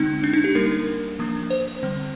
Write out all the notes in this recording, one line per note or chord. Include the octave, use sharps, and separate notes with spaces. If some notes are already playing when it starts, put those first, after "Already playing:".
Already playing: D3 G#3 C4 D#4
D4
D#4
G4
G3 A#3 D4 A#4
F3 A#3 D4
C5
D3 G3 C4